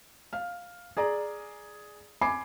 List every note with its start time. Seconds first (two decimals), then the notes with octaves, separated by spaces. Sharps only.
0.33 F5 F6
0.97 G#4 D5 A#5
2.21 G#5 B5 D6 C7